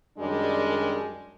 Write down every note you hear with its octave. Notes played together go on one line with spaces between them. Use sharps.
F#2 D#3 G3 G#3 D4